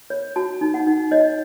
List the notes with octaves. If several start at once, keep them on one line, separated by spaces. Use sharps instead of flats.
C#5
F#4 A5
D#4
F#5
D#4
C#5 D#5